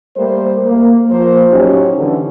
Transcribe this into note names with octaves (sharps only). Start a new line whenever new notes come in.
G3 A3 A#3 A#4 C5
A#3
F3 A#3 C5
A2 F#3 C#4 D#4 G4
D3 E3